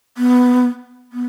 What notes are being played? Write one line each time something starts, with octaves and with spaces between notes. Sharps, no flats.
B3
B3